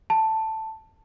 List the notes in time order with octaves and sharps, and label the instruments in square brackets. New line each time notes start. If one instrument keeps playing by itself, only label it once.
[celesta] A5